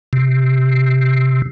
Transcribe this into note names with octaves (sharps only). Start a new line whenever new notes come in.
C3